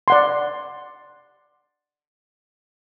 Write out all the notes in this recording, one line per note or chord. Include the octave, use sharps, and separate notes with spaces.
D5 F#5 C6